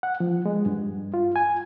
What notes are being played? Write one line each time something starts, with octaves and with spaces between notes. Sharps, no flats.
F#5
F3
G#3
G2
F4
G#5